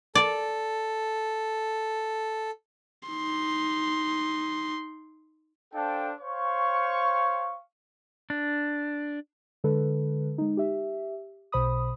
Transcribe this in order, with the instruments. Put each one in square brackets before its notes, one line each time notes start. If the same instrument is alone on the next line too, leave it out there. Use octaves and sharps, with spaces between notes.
[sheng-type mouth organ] A4 [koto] D5
[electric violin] D#4 C6
[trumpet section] D4 A4 C5 F5 G5
C5 C#5 F5 C#6
[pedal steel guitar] D4
[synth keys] D3 G#3 A4 B4
G#3 D#4
G4 E5
B1 B2 C5 B5 D#6